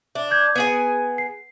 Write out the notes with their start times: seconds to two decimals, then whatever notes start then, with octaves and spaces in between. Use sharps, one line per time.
0.15 D4 E5
0.30 D6 G6 G#6
0.55 B3 G#4 G#5 G#6
1.18 C7